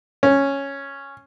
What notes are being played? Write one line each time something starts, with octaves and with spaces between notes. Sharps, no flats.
C#4